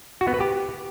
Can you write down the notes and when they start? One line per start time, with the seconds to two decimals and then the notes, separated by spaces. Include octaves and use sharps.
0.21 F#4
0.27 B3
0.34 B4
0.40 G4